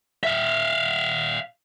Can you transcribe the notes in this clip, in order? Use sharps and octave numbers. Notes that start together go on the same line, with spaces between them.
E5 F5